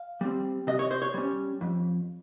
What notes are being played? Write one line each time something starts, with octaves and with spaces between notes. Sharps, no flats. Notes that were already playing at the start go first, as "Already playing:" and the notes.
Already playing: F5
G3 C4
C3 D#5
C#5
C5
C#5
G3 C#4
F2